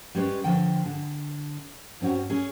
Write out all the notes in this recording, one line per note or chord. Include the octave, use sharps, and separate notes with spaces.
G3 G#3 C#4 B4
D3 F3 G5
D3
G2 C4 C#4 F#4
C#4 G#4